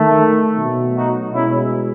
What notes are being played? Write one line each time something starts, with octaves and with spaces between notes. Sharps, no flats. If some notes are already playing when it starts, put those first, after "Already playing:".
Already playing: D#3 A3
B2 F#3 A3
D#4 F#4
B2 G#3 C#4 E4